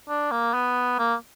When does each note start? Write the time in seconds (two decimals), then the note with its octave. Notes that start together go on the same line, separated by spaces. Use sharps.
0.09 D4
0.31 A#3
0.54 B3
0.99 A#3